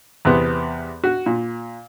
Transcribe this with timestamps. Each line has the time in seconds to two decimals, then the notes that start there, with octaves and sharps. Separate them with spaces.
0.25 E2 C3 B3
1.04 F#4
1.26 A#2